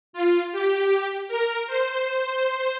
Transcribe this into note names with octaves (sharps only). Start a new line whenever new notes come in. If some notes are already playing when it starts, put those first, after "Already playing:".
F4
G4
A#4
C5